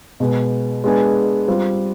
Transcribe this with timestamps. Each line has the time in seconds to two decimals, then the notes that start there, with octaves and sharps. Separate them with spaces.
0.20 B2 G#3 B3
0.84 G#3 B3 D4 G#4
1.48 G3 C4 F4